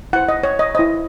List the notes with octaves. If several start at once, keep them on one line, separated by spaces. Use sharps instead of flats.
E4 C5 F#5
D#5
C#5
D#5
E4 C5 D#5